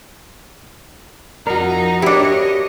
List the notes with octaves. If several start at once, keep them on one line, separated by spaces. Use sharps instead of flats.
F2 D#4 F#4 A#4
D4 E4 G4 C#5 D#5